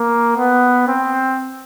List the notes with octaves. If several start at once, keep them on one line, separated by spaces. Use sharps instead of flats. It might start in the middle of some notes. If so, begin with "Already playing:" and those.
Already playing: A#3
B3
C4